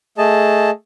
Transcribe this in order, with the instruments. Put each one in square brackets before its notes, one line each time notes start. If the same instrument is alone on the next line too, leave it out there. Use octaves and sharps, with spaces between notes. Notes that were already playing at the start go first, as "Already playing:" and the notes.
[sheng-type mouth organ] A3 G#4 D#5 A5